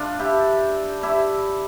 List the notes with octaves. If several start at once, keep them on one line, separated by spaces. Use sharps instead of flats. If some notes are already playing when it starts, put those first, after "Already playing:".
Already playing: D4 F4 A4
E4 G4
E4 G4